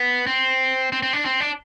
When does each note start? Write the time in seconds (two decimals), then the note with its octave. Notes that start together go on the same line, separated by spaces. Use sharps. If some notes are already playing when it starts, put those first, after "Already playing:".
Already playing: B3
0.27 C4
0.92 C4
1.03 C4
1.13 D4
1.25 C4
1.40 D4